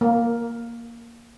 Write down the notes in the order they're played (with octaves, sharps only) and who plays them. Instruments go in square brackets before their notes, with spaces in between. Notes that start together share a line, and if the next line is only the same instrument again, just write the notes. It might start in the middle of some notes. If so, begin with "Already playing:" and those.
[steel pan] A#3